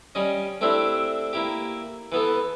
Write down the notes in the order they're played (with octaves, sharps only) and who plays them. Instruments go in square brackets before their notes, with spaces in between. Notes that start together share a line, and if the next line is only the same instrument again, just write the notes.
[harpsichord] G3 C#4 D#5
A3 C4 D4 E4 G4 C5
A#3 E4 G4
E3 B3 A4